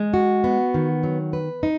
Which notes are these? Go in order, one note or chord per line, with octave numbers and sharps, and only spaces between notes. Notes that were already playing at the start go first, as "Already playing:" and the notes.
Already playing: G#3
F#4
B3
D#3
F#3
B4
D#4